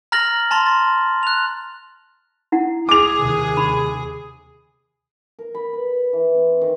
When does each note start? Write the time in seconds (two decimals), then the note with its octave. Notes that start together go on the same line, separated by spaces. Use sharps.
0.12 A#5 F6 A6 A#6 F#7
0.51 A5 A#5 C6 A6
0.66 A6
1.23 F#6 F7
2.52 E4 F#5
2.89 G#4 D6 F7
3.18 D#2 C3
3.57 B5 C#6
5.39 A#4
5.55 B5
5.73 B4
6.13 E3
6.35 C4
6.61 D#3